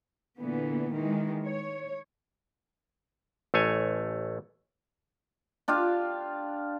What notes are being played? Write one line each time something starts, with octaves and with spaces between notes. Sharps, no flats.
A#2 D3 E3 B3
D#3 E3 G#3
C#5
A1 A3 C#5 G#5
D4 F4 G4 F5